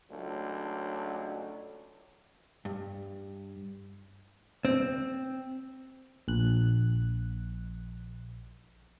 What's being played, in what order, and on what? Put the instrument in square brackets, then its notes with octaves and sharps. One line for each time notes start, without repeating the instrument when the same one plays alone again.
[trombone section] C#2 F#3 A3 D4
[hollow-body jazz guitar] G2
C4
[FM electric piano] A#1 F#6